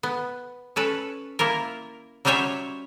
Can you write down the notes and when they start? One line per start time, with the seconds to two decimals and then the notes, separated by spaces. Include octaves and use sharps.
0.03 B3
0.76 C#4 A4 B4
1.39 A#3 E4 F4 A#4
2.25 F#3 G3 C#4 C5 C#5 E5